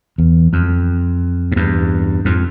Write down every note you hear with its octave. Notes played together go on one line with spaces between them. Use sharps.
E2
F2
G#2
E2 G2
F2 G#2